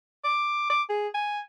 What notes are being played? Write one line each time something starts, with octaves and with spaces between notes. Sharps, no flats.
D6
D6
G#4
G#5